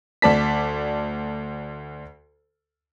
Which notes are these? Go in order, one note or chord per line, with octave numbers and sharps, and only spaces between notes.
D2 D5 A5 B6